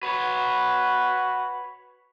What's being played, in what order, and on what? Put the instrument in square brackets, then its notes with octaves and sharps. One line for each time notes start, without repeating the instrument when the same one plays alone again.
[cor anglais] F#4 [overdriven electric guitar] B4 C#5